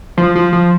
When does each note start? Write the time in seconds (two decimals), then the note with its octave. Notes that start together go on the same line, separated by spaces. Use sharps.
0.18 F3
0.35 F3
0.53 F3